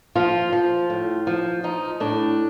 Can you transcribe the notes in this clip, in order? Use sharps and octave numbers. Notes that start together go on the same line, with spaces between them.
F3 F4
F3
A2
F3
F3 D#4
A2 D4